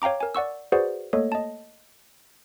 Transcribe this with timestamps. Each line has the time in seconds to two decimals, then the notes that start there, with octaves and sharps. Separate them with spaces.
0.02 C#5 F5 G5 A#5 D6
0.20 A#4 G#5
0.35 D5 F#5 C#6 E6
0.72 F#4 G#4 B4 C5 D5 F#5
1.13 A3 A#3 A4 C#5 D#5
1.32 D#5 A5